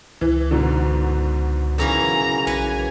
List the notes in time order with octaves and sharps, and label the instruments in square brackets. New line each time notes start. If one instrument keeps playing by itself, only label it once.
[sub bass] C#2 [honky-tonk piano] E3
[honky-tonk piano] G#2 B2 D3
[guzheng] F#2 C#3 E3 [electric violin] A#5
[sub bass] A#1 [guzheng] B4 F#5 [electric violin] G#5